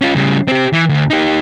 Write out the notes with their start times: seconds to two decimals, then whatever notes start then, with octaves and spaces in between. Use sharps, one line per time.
0.02 C#4 F4
0.16 C#3 G3
0.48 C4 G4
0.73 E3
0.89 D2
1.10 D#4 G4